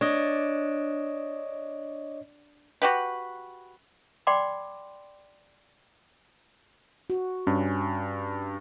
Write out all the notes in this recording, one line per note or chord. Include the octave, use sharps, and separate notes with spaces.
D4 C#5 D#5
F#4 G4 B4
D5 F#5 G5 B5 C6 D6
F#4
G2 C#4